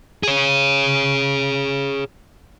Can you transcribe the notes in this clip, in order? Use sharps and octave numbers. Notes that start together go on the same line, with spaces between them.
G#4 C#5